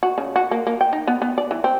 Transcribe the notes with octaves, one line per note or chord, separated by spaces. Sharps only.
F#4
C#3
F#4
A#3
A#3
G5
D#4
B3
B3
D5
E3
C4